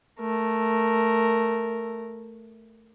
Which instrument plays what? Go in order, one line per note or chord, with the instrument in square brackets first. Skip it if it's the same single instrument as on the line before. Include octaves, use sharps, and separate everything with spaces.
[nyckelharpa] A3 A#4